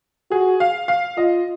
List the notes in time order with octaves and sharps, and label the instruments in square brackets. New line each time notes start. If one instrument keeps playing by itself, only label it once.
[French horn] F#4 [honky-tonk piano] G#4
[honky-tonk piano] F5
F5
[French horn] F4 [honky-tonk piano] D#5